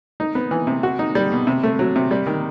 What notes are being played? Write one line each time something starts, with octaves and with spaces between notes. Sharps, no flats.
D#4
B3
E3
C3
F#4
D#4
G3
B2
C3
A3
F#3
C3
G3
D#3